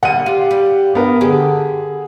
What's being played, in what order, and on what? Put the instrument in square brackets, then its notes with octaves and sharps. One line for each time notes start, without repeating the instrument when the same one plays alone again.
[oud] D3 G3 A#3 [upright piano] F#5 D#7
[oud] F4 [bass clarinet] G4
[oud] G3
[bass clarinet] G2 [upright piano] B3 A#4
[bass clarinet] D3 [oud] G4 [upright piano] G#4